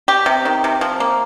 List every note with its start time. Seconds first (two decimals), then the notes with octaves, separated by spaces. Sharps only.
0.08 G4
0.26 C3
0.45 D#3
0.64 C3
0.81 F3
1.00 A#3